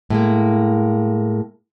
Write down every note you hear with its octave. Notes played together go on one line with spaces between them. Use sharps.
A2 G#3 A#3